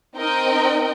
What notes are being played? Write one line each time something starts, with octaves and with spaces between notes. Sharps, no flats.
C4 D#4 A#4 D#5 G5